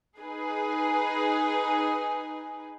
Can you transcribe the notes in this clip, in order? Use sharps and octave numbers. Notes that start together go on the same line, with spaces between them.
D#4 G#4 B4